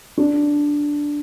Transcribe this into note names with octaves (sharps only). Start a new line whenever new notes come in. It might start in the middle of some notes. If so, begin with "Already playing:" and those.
D4